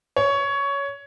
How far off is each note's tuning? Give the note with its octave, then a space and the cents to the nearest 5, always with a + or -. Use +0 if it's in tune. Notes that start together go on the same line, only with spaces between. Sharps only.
C#5 +15